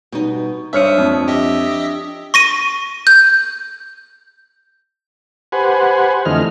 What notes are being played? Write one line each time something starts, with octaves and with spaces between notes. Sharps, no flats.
B2 G3 D#4
G2 D4 C5 C#5 E5 D#6 F6 C#7
F2
G4 D#5 E5
C#6 A#6 D#7
G6
G4 B4 C5 F#5 G#5
F2 D3 E3 A3 D#5 F6